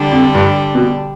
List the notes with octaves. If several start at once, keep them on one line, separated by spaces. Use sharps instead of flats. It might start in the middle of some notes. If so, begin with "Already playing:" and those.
Already playing: D3 G3 D4
F2
G2
B2